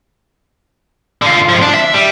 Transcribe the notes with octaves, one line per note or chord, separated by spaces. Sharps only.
D3 F4
G#2 F3
D4
E5
G3